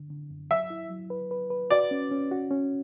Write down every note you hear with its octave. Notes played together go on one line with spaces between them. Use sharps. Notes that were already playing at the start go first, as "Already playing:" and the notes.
Already playing: D3
D3
F#2
F#3 E5
E4
F#3
B4
B4
B4
F#4 D5
C#4
C#4
F#4
C#4